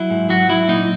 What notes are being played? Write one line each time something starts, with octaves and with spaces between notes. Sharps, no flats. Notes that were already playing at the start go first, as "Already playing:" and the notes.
Already playing: F#3 E4
G#2
F#3 F#4
F#3 E4
A#2 D#4